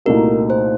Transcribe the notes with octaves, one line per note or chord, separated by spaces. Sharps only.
C2 A#2 A3 D#4 F#4 A#4
C5